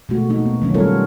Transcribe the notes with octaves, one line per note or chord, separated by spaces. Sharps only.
B2 G#3 A3 F#4
A#3 D#4 F#4
B3
D#3 F#3 C#4
G3 B3 F4 A4 A#4 C#5